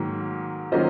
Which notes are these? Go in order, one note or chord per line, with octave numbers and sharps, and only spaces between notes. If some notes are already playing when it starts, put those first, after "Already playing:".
Already playing: G#2 D#3 F#3 A#3
D#3 F#3 A#3 C#4 F4 C5 D#5